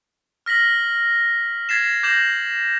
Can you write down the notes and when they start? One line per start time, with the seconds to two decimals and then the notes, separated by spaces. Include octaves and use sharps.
0.46 F6 A#6 B6 F#7
1.69 G#6 A6 B6 C7 E7
2.03 D6 G6 A#6 C7 E7 F#7